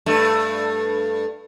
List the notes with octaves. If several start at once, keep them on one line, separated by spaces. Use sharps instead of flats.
G2 A3